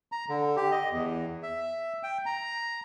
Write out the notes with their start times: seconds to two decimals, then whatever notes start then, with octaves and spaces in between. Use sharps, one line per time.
0.12 A#5
0.29 D3
0.57 G4
0.72 D#5
0.91 E2
1.43 E5
2.03 G5
2.26 A#5